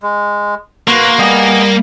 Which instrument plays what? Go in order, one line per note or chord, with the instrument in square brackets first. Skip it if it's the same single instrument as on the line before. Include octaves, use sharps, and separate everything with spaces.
[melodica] G#3
[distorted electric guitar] A#3 [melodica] F#4 C6 [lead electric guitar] B4 A#5
[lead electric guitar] G3 [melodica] B3 G#4 D#5